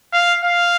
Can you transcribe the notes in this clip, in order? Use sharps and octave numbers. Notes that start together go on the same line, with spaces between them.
F5
F5